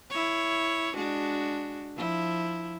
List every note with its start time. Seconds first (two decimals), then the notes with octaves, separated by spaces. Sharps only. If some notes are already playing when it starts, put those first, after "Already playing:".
0.10 E4 C#5
0.94 G#3 D4 F#4
1.97 F3 E4